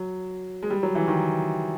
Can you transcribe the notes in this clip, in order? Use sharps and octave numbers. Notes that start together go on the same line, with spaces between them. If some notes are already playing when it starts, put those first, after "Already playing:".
Already playing: F#3
G#3
G3
F#3
E3
D#3